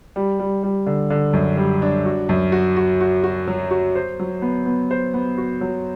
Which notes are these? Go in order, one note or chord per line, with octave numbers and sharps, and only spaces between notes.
G3
G3
G3
D3
D3
F#2
G3
D4
F#4
F#2
F#4
F#4
F#4
F#4
F#3
F#4
C5
F#3
B3
B3
C5
B3
F#4
F#3